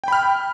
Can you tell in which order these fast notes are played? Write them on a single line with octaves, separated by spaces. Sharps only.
G5 B5 F6